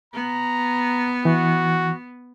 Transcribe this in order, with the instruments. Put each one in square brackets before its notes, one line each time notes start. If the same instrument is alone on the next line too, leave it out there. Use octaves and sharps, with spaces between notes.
[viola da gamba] B3 [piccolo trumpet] A#5
[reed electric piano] E3 [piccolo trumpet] F#4